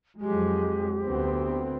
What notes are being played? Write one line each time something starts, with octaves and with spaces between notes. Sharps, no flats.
F2 F#3 G#3 G4
D2 B3 C4